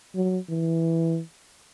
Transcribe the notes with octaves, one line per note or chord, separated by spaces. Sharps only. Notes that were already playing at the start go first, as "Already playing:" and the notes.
F#3
E3